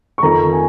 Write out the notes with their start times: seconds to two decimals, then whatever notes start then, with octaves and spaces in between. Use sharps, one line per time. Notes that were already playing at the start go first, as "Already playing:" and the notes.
0.18 C#6
0.23 F2 D#3 A#5
0.53 G#5